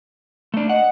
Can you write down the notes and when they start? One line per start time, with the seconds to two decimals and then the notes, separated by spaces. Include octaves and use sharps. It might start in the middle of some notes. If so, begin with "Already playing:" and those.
0.54 A3 D4
0.69 D#5 F#5